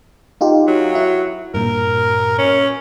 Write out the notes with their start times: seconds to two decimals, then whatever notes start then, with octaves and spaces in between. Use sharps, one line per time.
0.41 D#4 F4 G4
0.67 F#3
0.95 E4
1.54 G2 A#2 A#4
2.38 C#4